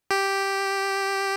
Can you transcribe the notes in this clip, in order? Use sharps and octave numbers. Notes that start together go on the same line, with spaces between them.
G4